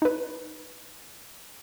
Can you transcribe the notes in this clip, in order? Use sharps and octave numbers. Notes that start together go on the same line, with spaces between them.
D#4 B4